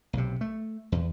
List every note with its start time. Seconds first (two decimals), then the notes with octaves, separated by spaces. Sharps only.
0.13 B1 C3
0.41 A3
0.92 E2